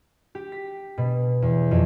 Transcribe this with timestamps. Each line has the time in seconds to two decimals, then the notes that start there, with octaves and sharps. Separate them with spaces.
0.35 G4
0.52 B6
0.98 B2
1.42 E2
1.71 F2